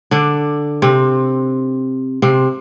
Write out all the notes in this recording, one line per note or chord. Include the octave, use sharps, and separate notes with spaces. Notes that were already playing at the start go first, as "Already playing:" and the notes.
D3 D4
C3 C4
C3 C4